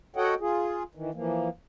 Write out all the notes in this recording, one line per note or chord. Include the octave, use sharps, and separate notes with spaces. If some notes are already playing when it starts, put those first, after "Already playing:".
F#4 A4 C#5 D#5 F#5 G5
F4 G#4
D#3 E3
E3 F3 A#3